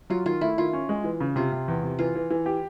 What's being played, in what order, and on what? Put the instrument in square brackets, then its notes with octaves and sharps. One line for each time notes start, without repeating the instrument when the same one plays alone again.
[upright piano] F#3 [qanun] F4
[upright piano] D#3 [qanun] F4
[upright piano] A3 [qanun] E4
[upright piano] D#3 [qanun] F4
[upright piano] C#4
G#3
E3
C#3
[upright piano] C3 [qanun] F4
[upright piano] C3
E2
C3
[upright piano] E3 [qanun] F4
[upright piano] E3
E3
G4